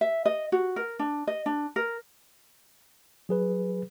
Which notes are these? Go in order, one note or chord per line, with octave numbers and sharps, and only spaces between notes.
E5
D#5
F#4
A#4
D4
D#5
D4
A#4
F#3 G#4 B4